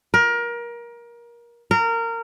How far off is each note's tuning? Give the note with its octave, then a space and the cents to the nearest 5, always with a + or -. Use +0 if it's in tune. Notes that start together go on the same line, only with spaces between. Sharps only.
A#4 +25
A#4 -20